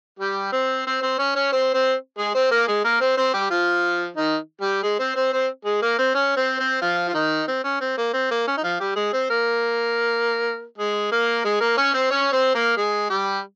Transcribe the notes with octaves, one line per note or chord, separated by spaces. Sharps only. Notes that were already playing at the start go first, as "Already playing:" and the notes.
G3 G4
C4 C5
C4 C5
C4 C5
C#4 C#5
C#4 C#5
C4 C5
C4 C5
G#3 G#4
C4 C5
A#3 A#4
G#3 G#4
A#3 A#4
C4 C5
C4 C5
G3 G4
F3 F4
D#3 D#4
G3 G4
G#3 G#4
C4 C5
C4 C5
C4 C5
G#3 G#4
A#3 A#4
C4 C5
C#4 C#5
C4 C5
C4 C5
F3 F4
F4
D#3 D#4
C4
C#4
C4
A#3
C4
A#3
C#4
D#4
F3 F4
G3 G4
G#3 G#4
C4 C5
A#3 A#4
G#3 G#4
A#3 A#4
G#3 G#4
A#3 A#4
C#4 C#5
C4 C5
C#4 C#5
C4 C5
A#3 A#4
G#3 G#4
G3 G4